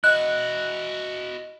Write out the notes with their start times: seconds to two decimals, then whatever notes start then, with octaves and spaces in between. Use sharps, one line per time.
0.04 E4 F#4 D#5 F#6